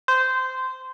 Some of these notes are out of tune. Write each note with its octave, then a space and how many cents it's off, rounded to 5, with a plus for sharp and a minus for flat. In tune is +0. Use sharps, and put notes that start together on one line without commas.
C5 -15